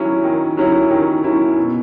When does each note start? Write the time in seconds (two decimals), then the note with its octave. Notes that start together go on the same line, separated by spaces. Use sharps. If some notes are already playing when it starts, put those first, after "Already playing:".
Already playing: D#3 F#3 C#4 E4
0.24 D#3
0.57 F#3 C#4 E4
0.90 D#3
1.24 F#3 C#4 E4
1.57 B2